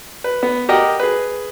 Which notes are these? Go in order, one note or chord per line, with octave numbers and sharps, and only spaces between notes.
B4
B3
G4 A#4 D#5 F#5 G5
G#4 B4